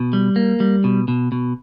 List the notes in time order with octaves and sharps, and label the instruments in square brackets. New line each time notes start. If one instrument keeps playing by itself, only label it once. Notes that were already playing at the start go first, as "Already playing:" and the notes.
Already playing: [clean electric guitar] B2
G3
A#3
G3
B2
B2
B2